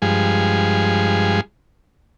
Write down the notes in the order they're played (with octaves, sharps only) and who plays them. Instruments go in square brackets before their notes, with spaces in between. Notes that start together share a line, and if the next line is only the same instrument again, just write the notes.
[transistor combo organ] G2 F3 G#3 G#4